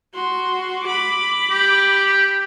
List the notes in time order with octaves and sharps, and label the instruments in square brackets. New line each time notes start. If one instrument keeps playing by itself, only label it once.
[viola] F#4 C6
B5 D6
[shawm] G4